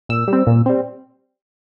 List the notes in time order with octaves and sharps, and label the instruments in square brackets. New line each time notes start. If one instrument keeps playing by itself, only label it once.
[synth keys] A#2 E6
G3 C4
A#2
G3 C4